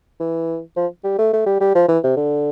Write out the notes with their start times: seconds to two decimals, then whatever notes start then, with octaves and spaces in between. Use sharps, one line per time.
0.20 E3
0.77 F3
1.04 G3
1.19 A3
1.33 A3
1.46 G3
1.61 G3
1.75 F3
1.89 E3
2.04 C3
2.17 D3